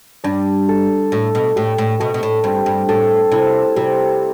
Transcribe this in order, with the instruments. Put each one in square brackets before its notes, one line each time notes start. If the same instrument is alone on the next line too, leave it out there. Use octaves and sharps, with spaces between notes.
[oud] G2 [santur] D4
[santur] A4
[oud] A2 [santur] A3
[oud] B2
[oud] A2 [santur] G4
[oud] A2
[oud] B2 [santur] A3
[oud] B2
A2
[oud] G2 [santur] C4
[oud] G2
[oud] A2 [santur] A4
[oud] C3 [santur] E4
[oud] C3 [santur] G3